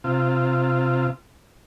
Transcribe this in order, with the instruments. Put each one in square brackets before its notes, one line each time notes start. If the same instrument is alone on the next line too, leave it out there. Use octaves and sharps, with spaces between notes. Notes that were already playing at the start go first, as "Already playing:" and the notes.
[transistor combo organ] C3 F4